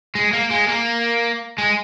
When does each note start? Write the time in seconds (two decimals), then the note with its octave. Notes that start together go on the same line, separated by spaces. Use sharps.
0.15 G#3
0.33 A#3
0.50 G#3
0.68 A#3
1.58 G#3